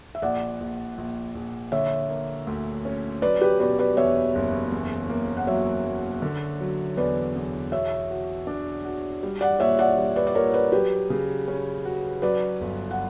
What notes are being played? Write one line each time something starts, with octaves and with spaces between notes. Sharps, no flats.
E5
A#1 D5 F#5
A#1
A#1
A#1
D3 C#5 E5
A#3
D2
C#4
F#3 B4 D5
G4 B4
B2 B4 D5
B4 D5
E2 C#5 E5
F#1
E2
A#3
F#5
F#3 C#5 E5
F#3
D3
F#3
E2 B4 D5
E2
B2 C#5 E5
F#4
D4
F#4
G3
D5 F#5
A#2 C#5 E5
D5 F#5
G3
B4 D5
D5
A#2 A#4 C#5
B4 D5
F#3 G4 B4
C#3
C#4
F#4
F#3 B4 D5
G1
F#5